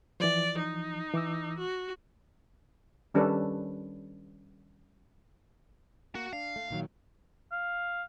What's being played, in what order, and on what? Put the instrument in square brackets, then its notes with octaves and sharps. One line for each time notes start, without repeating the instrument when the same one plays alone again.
[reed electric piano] E3 F3 [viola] D5
[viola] D#4
[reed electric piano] E3 D6 E6
[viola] F#4
[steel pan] D#3 G3 C#4 D4 A4 B4
[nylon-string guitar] A#3 [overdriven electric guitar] F#4
[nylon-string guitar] D4 [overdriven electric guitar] F5
[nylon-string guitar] A3
A#2 D#3 F#3
[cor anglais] F5